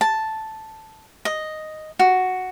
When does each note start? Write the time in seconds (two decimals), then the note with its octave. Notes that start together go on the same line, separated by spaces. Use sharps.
0.01 A5
1.25 D#5
1.99 F#4